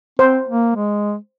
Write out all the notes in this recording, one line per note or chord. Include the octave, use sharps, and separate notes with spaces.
C4 C5
A#3
G#3